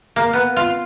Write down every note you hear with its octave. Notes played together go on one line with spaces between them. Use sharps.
A#3
B3
F4